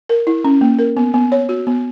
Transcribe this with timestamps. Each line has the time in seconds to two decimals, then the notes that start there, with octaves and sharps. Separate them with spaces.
0.09 A#4
0.27 E4
0.45 C#4
0.61 A#3
0.79 A#4
0.97 B3
1.14 B3
1.32 C#5
1.49 F#4
1.67 B3